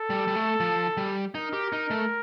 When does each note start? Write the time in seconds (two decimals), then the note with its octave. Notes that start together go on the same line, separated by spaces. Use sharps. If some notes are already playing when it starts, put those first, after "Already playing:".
Already playing: A4
0.10 G3
0.27 G3
0.36 A3
0.60 F3
0.97 G3
1.35 D#4 A#4
1.53 G4
1.72 D#4
1.91 A3